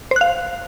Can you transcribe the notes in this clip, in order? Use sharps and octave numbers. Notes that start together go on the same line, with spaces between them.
C5 F5 F#6